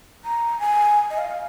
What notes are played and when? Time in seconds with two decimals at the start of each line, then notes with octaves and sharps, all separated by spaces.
0.25 A#5
0.60 G#5
1.10 D#5
1.18 F5